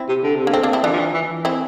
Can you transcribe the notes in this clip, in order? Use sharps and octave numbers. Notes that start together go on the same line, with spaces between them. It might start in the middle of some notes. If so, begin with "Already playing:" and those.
Already playing: C4 E4
C3
D3
C3
D3 A#3
C4
A#3 D4
C4 E4
E3 D4 F4
F3
E3
E3
E3
C4 E4